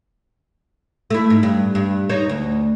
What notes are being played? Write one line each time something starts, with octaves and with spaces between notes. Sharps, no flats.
A3 E4
G#2
G2
G2
D#4 C5 C#5
D2